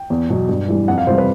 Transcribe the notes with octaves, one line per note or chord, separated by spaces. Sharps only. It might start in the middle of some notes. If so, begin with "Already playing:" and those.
Already playing: G5
E2
B2 F#3
G2
E3 G3
F2 F#5
F5
C3 E3 G3 C5
B4